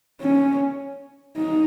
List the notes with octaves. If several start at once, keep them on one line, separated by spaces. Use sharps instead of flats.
C#4
D#4